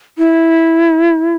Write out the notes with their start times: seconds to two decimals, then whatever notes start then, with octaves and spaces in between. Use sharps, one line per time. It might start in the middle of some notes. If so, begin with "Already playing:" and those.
0.18 E4